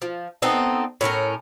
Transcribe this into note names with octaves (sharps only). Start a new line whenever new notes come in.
F3
B3 C4 D#4 A4
A2 C#4 F4 A#4